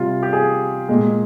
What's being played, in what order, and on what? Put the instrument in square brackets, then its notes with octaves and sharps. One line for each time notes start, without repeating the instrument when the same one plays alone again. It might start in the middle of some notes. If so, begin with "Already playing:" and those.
Already playing: [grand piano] C3 G3 F4
G4
G#4
A#2 G#3